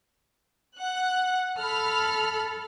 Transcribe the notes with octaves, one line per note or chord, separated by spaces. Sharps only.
F#5 F#6
A4 B5 F6